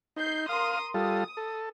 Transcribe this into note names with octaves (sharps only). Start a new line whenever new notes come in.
D#4 G6 C7
A#4 F5 C6 D#6
G3 F4 A4 D#6
A4